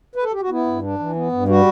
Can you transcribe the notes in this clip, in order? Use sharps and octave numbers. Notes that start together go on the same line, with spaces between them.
B4
A4
G4
F#4
B3 E4
G2
D4
E3
B3
G2
G3 F#4